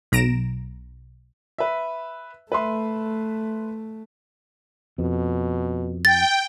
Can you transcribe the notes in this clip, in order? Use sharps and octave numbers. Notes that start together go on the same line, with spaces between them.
B1 A#5 A#6 D7 E7
B4 E5
A3 B4 E5 C6
F2 B2
G5 A6